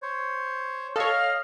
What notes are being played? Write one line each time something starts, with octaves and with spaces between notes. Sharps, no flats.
C5 C#5
A4 C#5 D#5 F5 F6